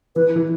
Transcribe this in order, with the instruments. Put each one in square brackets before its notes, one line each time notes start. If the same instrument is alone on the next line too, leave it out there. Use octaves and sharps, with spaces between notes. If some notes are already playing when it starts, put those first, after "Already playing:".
[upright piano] E3 [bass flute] B4
[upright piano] E3